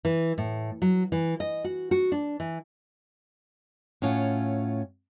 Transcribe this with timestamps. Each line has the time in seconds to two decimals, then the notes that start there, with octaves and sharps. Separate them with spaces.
0.05 E3
0.38 A2
0.82 F#3
1.12 E3
1.40 D#5
1.64 F#4
1.91 F#4
2.12 D4
2.40 E3
4.02 A2 C#4 F4 F#5